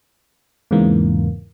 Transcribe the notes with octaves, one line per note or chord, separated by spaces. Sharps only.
E2 G#2 C#3 E3 A#3